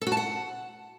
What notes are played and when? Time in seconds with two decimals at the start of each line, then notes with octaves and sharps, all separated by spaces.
0.01 A4
0.07 F#4
0.12 A5
0.17 F#5